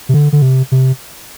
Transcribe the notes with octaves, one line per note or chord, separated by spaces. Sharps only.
C3
D3
D3
C3
C3